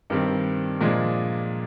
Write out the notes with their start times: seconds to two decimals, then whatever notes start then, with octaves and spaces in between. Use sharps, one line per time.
0.10 G2 D#3 G3 C4
0.81 A#2 F3 G#3 D4